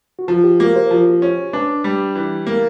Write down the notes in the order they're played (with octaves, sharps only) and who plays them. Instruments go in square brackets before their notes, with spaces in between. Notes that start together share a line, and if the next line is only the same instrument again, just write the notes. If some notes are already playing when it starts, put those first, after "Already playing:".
[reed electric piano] F#4
[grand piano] F3 [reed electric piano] F4
[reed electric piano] G4
[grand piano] A#3 [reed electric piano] F#4
[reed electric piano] C5
[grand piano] F3
C#4
[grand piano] D4 [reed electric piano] B4
[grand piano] G3
E3
A#3